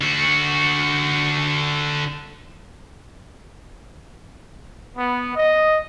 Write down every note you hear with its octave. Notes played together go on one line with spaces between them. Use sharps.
D3 F#4
B3
D#5